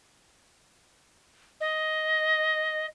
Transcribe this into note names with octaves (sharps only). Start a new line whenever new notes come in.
D#5